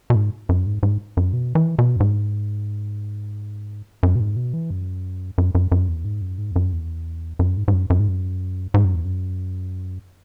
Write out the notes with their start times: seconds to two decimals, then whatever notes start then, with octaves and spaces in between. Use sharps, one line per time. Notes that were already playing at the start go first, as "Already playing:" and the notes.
0.10 B2
0.15 G#2
0.49 F#2
0.66 G#2
0.83 G#2
1.17 F#2
1.33 B2
1.55 E3
1.79 B2
1.96 F#2
2.00 G#2
4.03 F#2
4.16 B2
4.20 G#2
4.36 B2
4.53 E3
4.70 F#2
5.38 F#2
5.55 F#2
5.72 F#2
5.88 E2
6.05 G#2
6.22 F#2
6.38 G#2
6.51 E2
6.56 F#2
6.73 E2
7.39 F#2
7.57 G#2
7.68 G#2
7.73 F#2
7.90 F#2
8.00 G#2
8.08 F#2
8.74 G#2
8.85 F#2
8.95 E2
9.05 F#2